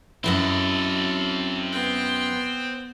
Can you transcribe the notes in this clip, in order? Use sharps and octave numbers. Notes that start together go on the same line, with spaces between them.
F#2 F#3 C4 E4 A4 D#5
B3 G5